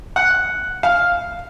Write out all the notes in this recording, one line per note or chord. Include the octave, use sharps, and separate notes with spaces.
F#5
F5